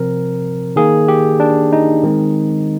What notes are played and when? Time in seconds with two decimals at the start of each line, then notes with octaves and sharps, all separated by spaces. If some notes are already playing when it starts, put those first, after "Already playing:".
Already playing: C3 F3 C4 A#4
0.76 D#3 A#3 G#4
1.08 G4
1.40 D4
1.73 D#4
2.03 D#3 G#3 C4